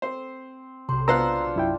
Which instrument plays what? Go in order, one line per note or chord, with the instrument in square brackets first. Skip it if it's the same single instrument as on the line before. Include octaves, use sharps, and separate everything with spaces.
[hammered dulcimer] C4 [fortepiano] C5
[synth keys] B1 C3 [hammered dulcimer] C5
[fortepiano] B3 C5 F#6 [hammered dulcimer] D4 F4 F5 [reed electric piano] A#5 E6
[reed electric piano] F#2 E4 G5